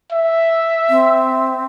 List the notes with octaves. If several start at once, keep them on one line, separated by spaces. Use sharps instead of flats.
E5
C4